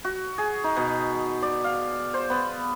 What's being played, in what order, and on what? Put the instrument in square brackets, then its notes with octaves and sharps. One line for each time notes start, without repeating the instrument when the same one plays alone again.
[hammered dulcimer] F#4
G#4
D#4
B2
D5
F5
C5
B3